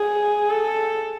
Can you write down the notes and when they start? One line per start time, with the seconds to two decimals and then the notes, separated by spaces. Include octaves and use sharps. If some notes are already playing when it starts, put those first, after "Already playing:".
Already playing: G#4
0.50 A4